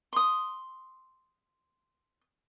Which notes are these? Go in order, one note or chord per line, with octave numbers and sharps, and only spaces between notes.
C6 D#6